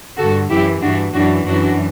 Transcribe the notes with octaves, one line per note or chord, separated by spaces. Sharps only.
G2 D3 F#4 A4
F#2 E3 E4 G4
G2 E3 D4 F#4
F#2 E3 D4 F#4
F#2 E3 D4 F#4